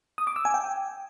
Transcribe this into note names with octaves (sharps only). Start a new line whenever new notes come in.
D#6
D6
E6
G#5
G5